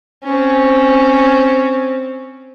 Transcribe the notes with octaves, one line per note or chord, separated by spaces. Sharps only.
C4 C#4